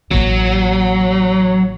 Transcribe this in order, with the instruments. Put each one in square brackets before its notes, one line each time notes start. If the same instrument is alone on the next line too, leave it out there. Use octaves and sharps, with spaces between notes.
[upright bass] A1 A#3 [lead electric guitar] F#3